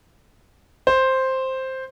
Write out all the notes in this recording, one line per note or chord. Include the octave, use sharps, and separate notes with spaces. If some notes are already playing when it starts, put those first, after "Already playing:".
C5